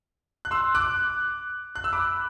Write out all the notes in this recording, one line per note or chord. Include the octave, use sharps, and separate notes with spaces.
F#6
C6 E6
D6 F#6
F#6
E6
B5 D6